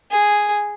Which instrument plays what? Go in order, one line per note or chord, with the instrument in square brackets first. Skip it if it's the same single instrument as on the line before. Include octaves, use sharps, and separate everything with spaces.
[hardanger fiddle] G#4